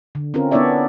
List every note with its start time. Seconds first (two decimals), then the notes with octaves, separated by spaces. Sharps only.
0.15 D3
0.34 C4 C#4 F4 A#4
0.51 B3 D4 E4 C#5 D5 E5